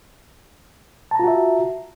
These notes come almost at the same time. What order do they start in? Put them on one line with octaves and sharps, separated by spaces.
A5 A#5 F4 F#4 E5